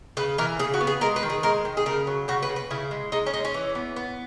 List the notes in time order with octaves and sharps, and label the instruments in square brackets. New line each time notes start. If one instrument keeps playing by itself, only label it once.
[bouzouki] C#3 B4
E3 A#4
C#3 G#4
F#4
B3
G#4
G#3 A#4
B4
D#3
G#4
G#3 A#4
D#3
G#4
C#3 A#4
F#3
C#3 F#4
B4
C#3
B4
C#3 E4
G#3
G#3 D#4
C#4
G#3 D#4
C#4
E3
B3
B3